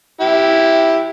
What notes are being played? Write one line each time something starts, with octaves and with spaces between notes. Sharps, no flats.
E4 G4